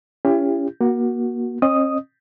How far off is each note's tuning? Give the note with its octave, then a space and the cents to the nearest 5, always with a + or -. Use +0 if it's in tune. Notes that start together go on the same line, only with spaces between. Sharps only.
C#4 +20 E4 +40 G4 +30
A#3 +30 F#4 +0
C4 +45 D#5 -25 D#6 +0